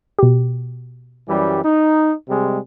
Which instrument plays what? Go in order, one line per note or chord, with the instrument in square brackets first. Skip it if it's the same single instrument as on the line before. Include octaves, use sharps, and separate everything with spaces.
[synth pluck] B2 G4
[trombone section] F#2 E3 G3
D#4
C3 G3 G#3